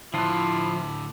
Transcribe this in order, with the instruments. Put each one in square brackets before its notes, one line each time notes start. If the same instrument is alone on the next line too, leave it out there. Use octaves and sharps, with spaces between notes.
[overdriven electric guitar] A2 D3 [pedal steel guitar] F3 F4 [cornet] E4 [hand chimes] A5 B5 F#6